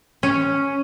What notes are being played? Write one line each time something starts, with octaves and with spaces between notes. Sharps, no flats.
C#4